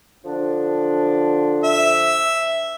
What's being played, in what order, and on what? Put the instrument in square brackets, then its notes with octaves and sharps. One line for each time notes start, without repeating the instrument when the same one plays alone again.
[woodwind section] D3 F3 D4
[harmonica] E5